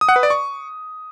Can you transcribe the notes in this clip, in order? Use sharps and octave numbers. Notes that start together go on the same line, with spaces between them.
D#6
F#5
B4
D5
C#6